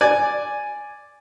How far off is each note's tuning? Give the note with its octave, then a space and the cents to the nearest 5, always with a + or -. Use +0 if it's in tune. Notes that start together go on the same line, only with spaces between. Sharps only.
D5 +0 G#5 +0